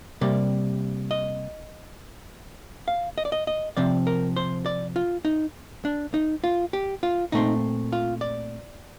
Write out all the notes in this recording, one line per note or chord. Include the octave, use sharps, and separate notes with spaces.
C3 G3 A#3 D5
D#5
F5
D#5
D5
D#5
D#5
C3 F3 C4 D5
A#4
C5
D5
F4
D#4
D4
D#4
F4
G4
F4
A#2 A3 C4 D#4
F4
D5